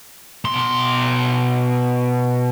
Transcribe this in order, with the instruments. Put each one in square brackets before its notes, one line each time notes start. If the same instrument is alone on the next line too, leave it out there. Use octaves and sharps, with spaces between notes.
[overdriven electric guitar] B2 C6